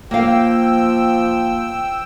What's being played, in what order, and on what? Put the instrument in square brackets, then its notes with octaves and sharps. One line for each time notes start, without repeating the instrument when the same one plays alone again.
[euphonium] F3 [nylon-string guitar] A#3 F5 [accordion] G5 E6